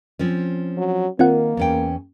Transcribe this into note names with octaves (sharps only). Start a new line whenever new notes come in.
F3 C4 C#4
F#3
D#3 A#3 C4 F4 F#5
E2 C#4 G5